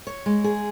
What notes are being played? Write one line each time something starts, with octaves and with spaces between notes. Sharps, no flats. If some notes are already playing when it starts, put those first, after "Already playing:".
C#5
G#3
G#4